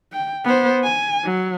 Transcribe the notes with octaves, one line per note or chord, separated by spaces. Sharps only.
G5
B3 C5
G#5
F#3